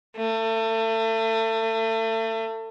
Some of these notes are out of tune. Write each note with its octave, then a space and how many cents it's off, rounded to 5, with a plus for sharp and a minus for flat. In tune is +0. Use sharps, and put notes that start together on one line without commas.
A3 +30